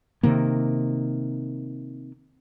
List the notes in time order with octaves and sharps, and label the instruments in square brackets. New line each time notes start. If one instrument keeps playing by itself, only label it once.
[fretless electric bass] C3 D#3 A#3